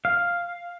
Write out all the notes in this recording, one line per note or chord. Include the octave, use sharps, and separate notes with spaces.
F5